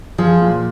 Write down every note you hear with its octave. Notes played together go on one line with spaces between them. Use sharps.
F3 G#4
A#2